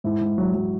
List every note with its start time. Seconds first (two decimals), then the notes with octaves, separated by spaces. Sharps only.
0.04 G#2 E4
0.21 G#2
0.38 F#3
0.54 F#3